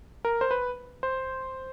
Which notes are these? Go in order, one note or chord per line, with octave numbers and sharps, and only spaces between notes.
A#4
C5
B4
C5